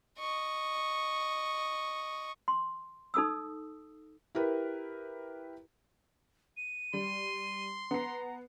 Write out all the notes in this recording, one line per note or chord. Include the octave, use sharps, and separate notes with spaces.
D#5 C#6
C6
D#4 A4 D#6 E6
E4 G4 A#4 B4
D#7
G3 C6
B3 A#5 C7